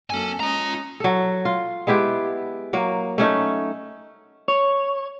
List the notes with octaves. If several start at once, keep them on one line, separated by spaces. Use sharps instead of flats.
F#2 A#3 C#4 A4 G#5
G#3 C#4 F4 D#5 A#5
F#3 A4
F4
G#3 B3 E4 G4
F#3 A#3
A3 C#4 D#4
C#5